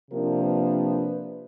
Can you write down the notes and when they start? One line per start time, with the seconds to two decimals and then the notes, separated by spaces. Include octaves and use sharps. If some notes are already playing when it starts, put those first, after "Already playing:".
0.11 C3 F3 A#3 D4 A#4
0.43 B4